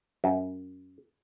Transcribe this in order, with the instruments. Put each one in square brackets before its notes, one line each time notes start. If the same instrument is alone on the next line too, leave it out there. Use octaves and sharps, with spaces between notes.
[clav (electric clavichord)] F#2